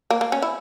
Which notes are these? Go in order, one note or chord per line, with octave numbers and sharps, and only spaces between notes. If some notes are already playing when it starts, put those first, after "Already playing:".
A#3
A#3
C#4
E4